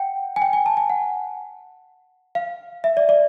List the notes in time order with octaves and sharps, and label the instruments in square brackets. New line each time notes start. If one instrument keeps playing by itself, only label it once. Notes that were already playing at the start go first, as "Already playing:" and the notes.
Already playing: [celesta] F#5 G5
G#5
G5
G#5
A5
G#5
F#5
F5
E5
D5
D5